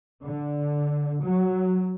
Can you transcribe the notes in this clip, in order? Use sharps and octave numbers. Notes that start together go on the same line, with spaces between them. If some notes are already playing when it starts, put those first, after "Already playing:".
D3
F#3